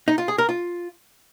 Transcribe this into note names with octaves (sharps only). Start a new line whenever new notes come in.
D#4
F4
G#4
A#4
F4